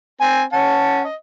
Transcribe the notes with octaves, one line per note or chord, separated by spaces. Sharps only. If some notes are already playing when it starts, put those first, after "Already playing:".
C4 G#5
C#4 F#5 A5
D#5